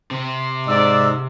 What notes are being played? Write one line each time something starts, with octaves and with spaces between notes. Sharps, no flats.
C3
G#2 D5 E6